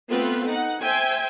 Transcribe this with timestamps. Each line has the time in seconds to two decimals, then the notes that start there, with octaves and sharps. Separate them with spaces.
0.10 A3 B3 C4 F4 B4
0.47 D#4 F#5
0.81 C5 E5 G5 G#5